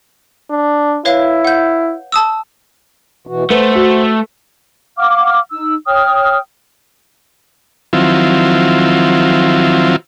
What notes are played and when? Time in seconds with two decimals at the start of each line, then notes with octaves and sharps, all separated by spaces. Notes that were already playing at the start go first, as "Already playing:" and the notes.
0.50 D4
1.05 E4 B4 C#5 F5
1.45 F#5 G6
2.12 A5 D#6 E6
3.27 B2 E3 F#4
3.50 A3 B4 C5 F#5
3.75 F#4
4.97 F5 F#5 D6 F6
5.51 D#4 E6
5.87 C#5 G5 D#6 F6
7.93 D#3 F3 F#3 C4 E4 F4